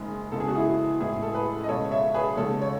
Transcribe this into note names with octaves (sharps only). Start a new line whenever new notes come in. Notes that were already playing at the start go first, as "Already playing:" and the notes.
Already playing: F#1 F#2 D#3 G#3 G#4
E2 C#3 G#3 A4
G#4
F#4
E4 G#4
A1 A2 G#3 E4 G#4
A4
G#4 B4
D#5
C#2 B2 G#3 A4 C#5
C#5 E5
G#4 B4
D#2 C#3 G#3 A4 C#5
C#5